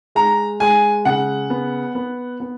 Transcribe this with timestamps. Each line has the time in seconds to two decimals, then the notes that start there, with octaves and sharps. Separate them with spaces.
0.15 G#3 A#5
0.60 G#3 G#5
1.05 C#3 F#5
1.50 B3
1.95 B3
2.40 B3